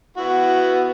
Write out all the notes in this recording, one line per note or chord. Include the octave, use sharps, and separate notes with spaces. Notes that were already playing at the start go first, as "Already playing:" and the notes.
B3 E4 F#4